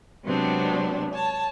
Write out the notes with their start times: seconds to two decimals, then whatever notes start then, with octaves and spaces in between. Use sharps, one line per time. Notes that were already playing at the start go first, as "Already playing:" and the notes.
0.25 C3 F#3 G#3 B3 C4 D4
1.13 C#5 A5